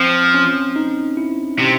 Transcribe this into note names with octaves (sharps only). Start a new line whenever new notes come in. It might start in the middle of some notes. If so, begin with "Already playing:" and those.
Already playing: F3 C4
C#4
D#4
E4
C3